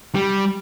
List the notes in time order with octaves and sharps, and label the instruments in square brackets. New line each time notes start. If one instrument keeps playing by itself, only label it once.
[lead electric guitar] G3